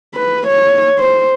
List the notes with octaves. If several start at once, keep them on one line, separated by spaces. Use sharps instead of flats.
B4
C#5
C5